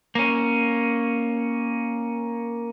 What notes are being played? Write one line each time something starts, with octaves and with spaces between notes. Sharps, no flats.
A#3 C#4